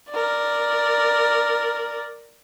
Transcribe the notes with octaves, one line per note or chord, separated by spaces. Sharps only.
A#4 D5